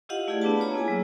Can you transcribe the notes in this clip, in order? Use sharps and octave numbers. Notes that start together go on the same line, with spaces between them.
E4 F4 G4 D#5 F5 F#5
A3 E4 G4 G#4 D5 F#5
B3 D4 B4 A5
F4 C#5 A#5
A#3 E4 G#4 G#5
F#3 A#3